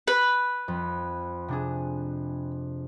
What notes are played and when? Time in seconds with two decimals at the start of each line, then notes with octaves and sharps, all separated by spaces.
0.08 B4
0.68 F2
1.48 C3 D4 G#4